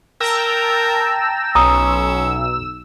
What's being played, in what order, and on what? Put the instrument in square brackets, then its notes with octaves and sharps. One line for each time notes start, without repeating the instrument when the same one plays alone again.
[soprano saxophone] A#4 [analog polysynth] G5 A5 A#5 [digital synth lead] E6
[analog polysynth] B1 [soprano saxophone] C#4 [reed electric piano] A#5 D#6